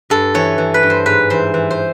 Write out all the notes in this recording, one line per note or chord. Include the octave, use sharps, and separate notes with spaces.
G2 A4
E3 C#5
E3
B4
G2
C5
G#2 B4
E3 C5
E3
C5